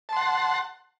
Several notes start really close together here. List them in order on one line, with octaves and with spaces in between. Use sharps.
A5 C6 F#5